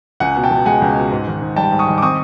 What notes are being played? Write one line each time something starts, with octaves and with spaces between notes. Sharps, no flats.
C#2 F#5 G#5
B2
G5 A5
C#2
G#3 F#5 G#5
C#2
B2
G#2
D#3
G#2
G3 G5 A5
G#2
C#6 D#6
D#3
D6
C4 C#6 D#6